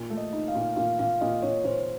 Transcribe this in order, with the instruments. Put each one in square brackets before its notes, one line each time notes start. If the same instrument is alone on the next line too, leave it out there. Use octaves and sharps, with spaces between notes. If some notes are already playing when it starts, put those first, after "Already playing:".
Already playing: [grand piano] A#2
A3
[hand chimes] D#5
[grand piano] D#4
[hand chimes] F5
[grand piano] A#2
[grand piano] A#2 [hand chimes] F5
[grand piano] A#2 [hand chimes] F5
[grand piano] A#2 [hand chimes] D#5
[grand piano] A#2 [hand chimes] C#5
[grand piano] A#2 [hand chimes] C5